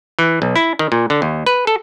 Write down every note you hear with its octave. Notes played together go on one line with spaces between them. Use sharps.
E3
B1
E4
D#3
A#2
D3
D#2
B4
A4